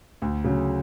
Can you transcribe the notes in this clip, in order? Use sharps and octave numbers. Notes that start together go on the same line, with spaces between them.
D2
C#3 F#3